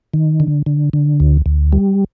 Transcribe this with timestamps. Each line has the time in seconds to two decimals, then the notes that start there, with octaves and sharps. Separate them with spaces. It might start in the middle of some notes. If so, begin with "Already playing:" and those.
0.14 D#3
0.40 D3
0.66 D3
0.93 D3
1.20 D2
1.46 D2
1.73 G3